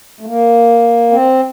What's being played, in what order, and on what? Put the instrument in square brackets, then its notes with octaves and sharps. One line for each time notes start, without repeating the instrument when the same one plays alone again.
[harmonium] A3
A#3
C4